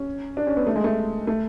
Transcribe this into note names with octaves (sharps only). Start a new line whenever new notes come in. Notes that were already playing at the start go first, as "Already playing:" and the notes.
Already playing: C#4
D4
C#4
B3
A3
G#3
A3
A3